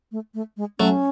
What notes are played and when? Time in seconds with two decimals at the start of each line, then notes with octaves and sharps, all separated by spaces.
0.12 A3
0.34 A3
0.57 G#3
0.79 F#3 A3 C#4